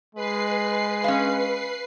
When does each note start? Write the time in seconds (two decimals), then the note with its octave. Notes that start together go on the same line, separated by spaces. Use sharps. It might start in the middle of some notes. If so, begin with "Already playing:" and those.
0.15 G#3 B4 C7
1.04 C#4 F5